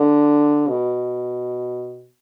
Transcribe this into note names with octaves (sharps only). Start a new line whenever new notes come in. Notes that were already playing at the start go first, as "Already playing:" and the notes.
Already playing: D3
B2